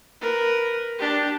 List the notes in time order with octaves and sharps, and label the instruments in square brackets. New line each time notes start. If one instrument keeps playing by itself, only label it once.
[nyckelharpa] A#4 B4
D4 G4